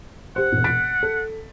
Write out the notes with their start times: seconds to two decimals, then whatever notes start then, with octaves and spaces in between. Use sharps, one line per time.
0.36 G4 C5 F#5
0.52 E1 A#2
0.64 A6 B6 D7
1.03 A4